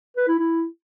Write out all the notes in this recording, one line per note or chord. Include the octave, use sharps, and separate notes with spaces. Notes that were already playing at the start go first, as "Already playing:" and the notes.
B4
E4
E4